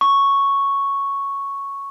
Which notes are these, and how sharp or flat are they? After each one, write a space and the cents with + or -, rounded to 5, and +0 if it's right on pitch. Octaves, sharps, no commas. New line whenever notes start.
C#6 +0